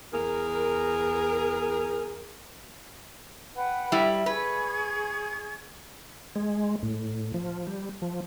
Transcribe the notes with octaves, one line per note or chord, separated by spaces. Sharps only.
E2 G#4 A#4
B4 F#5 G5
G3 E4
G#4 B4 C#6 G#6
G#3
A2
F3
G3
F3